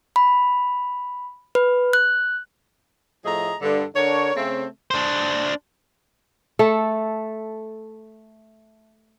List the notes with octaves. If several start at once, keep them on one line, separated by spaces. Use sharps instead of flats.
B5
B4
F#6
A2 F3 A3 G#4 D#5 A#5
G2 D3
D3 D4 A#4 C#5
C#3 A3 C4
D4 C5
A3 A4